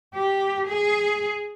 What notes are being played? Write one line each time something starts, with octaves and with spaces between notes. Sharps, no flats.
G4
G#4